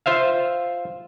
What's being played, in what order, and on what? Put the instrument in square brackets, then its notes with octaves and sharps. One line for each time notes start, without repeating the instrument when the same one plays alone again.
[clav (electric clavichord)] F4 C5 E5 F5